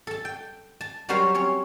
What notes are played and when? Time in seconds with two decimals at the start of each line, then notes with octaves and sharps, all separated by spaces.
0.07 A4 A5
0.25 G5
0.81 A5
1.09 F#3 G3 F#4 A#4 C5 C#5
1.34 C4 C#4 C#5